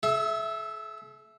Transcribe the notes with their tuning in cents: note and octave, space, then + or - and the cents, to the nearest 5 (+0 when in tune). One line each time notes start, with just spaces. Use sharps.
A4 -45 E5 +0